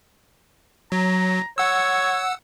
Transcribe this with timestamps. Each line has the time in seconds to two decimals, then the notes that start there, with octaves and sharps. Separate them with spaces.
0.92 F#3 A#5
1.58 C#5 F#5 E6